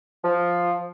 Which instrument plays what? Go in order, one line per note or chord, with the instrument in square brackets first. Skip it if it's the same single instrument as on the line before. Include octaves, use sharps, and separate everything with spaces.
[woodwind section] F3